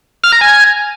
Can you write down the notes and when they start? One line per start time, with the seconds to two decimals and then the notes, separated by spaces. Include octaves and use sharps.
0.24 F6
0.32 A#5
0.41 G#5